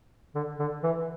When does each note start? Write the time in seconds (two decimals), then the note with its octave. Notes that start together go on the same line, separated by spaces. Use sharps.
0.35 D3
0.59 D3
0.83 E3